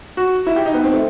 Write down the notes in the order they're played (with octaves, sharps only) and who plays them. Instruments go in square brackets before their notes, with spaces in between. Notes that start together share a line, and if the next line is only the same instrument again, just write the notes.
[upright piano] F#4
E4
G4
D#4
B3
C4
A3